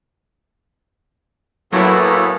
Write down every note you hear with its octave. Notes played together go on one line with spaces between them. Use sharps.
F#2 A2 F#3 A#3 B3 E4 A4 C#5